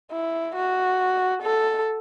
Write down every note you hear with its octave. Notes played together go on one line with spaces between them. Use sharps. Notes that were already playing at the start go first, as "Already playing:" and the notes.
E4
F#4
A4